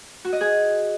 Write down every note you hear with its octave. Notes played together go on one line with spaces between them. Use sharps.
F#4
D#5
G#4